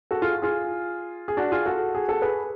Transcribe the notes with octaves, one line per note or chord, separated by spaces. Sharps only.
F#4 A4
F4 G#4
F4 G#4
G#4
D4 F#4
F4 G#4
F#4 A4
G#4
A4
G#4 B4